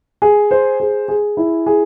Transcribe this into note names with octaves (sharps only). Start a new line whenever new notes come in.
G#4
C5
G#4
G#4
E4
G#4